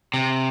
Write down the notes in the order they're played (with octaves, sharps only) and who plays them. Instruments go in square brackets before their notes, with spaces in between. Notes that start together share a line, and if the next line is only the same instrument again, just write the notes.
[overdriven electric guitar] C3